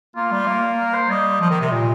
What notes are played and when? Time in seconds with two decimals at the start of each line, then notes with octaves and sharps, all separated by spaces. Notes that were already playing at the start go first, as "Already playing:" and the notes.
0.16 A#3 F4
0.32 G3
0.47 A#3
0.78 A#4
0.93 C5
1.09 G3 D#5
1.41 F3
1.51 D#3
1.61 C3
1.72 A#2 D#5